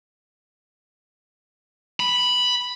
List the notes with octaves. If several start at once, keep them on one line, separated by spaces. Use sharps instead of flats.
B5